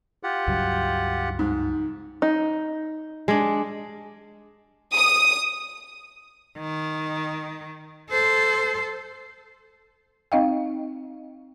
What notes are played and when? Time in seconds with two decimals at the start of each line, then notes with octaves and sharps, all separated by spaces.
0.23 F4 G4 F#5
0.48 C#2 G2 F#3
1.39 G#2
2.22 D#4
3.28 G#3 D4
4.95 D#6
6.58 D#3
8.10 A4 C5
10.32 C4 D#4 D#5 F5 G5